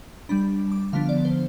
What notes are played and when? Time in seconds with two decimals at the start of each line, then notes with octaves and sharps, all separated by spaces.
0.29 G3 D4 B5
0.72 D6
0.93 D3 F3 B3 D4 F5
1.09 D5
1.25 C5